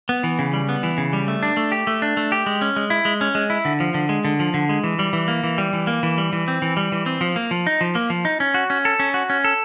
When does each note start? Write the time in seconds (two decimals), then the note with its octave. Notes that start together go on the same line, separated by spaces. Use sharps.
0.09 B3
0.24 E3
0.39 C#3
0.53 G3
0.69 B3
0.83 E3
0.98 C#3
1.13 G3
1.28 A3
1.43 D4
1.57 A3
1.72 G4
1.87 A3
2.02 D4
2.17 A3
2.32 G4
2.46 G#3
2.62 C#4
2.76 G#3
2.90 E4
3.05 G#3
3.21 C#4
3.35 G#3
3.50 E4
3.65 D3
3.80 F3
3.94 D3
4.09 G#3
4.25 D3
4.40 F3
4.54 D3
4.69 G#3
4.84 E3
4.99 G3
5.13 E3
5.28 A#3
5.44 E3
5.58 G3
5.73 E3
5.87 A#3
6.03 E3
6.18 G3
6.33 E3
6.48 C4
6.62 E3
6.77 G3
6.92 E3
7.06 C4
7.21 F3
7.36 A#3
7.51 F3
7.67 D#4
7.81 F3
7.95 A#3
8.10 F3
8.25 D#4
8.40 C#4
8.54 F#4
8.70 C#4
8.85 A4
9.00 C#4
9.14 F#4
9.30 C#4
9.44 A4